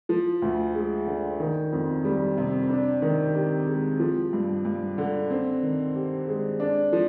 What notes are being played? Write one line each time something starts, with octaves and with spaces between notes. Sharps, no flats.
F3
D2
G#3
D3
D#3
F2
G3
C3
D4
D#3
G4
G#3
F3
G2
G2
D3
C4
D#3
G4
G#3
D4
F3